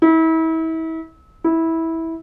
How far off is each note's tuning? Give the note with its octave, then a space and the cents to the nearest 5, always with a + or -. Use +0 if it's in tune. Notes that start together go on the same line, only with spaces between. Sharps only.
E4 -35
E4 -15